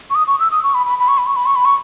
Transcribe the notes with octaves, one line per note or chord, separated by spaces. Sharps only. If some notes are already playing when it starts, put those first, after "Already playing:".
C#6
D#6
C#6
E6
D#6
C#6
B5
B5
B5
C#6
B5
C#6
B5
C#6
B5
C#6